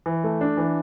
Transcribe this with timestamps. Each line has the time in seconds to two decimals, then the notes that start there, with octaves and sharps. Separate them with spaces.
0.06 E3
0.24 A3
0.41 D4
0.57 E3